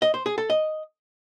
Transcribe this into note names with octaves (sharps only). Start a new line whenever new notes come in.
D#5
C5
G#4
A4
D#5